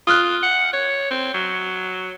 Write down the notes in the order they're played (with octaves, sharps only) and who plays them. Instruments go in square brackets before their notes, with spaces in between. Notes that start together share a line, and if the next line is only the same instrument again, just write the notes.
[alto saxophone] F4 [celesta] D#6 F6 F#6
[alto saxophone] F#5
C#5
C4
F#3